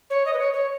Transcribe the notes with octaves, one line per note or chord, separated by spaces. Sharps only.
C#5
D#5
B4
C#5
C#5